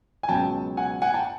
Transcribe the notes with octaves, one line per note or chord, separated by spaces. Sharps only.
G#5
C#2 B2 F#3 G5 A5
F#5 G#5
F#5 G#5
G5 A5